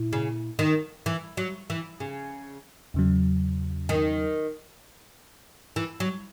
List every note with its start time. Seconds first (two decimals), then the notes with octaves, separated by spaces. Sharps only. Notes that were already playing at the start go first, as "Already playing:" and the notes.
Already playing: A#2 E4
0.13 C#3
0.59 D#3
1.06 E3
1.37 F#3
1.70 E3
2.00 C#3
2.94 E2 C#3 F#3
3.89 D#3
5.76 E3
6.00 F#3